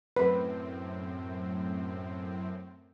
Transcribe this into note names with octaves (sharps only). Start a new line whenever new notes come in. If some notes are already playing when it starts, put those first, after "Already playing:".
F#2 A2 C4 B4